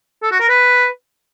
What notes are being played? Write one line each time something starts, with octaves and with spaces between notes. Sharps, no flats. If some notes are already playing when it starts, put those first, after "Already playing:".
A4
F#4
A#4
B4